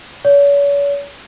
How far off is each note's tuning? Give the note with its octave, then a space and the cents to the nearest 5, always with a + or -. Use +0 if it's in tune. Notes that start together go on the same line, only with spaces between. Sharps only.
C#5 +40